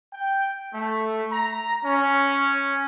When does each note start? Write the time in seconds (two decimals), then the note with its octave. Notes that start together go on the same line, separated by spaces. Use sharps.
0.13 G5
0.73 A3
1.31 A#5
1.84 C#4